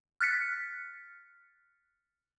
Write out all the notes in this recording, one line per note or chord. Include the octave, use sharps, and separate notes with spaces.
F6 F#6 A6 B6 C#7